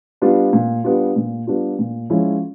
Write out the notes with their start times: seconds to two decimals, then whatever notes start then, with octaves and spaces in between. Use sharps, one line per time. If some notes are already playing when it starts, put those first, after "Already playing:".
0.22 G3 B3 D4 F4
0.53 A#2
0.84 G3 B3 D4 F4
1.16 A#2
1.47 G3 B3 D4 F4
1.79 A#2
2.10 F3 G#3 C#4 E4